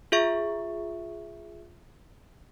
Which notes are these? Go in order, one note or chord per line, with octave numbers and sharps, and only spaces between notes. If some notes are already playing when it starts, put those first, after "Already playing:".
F4 G#4 E5 C#6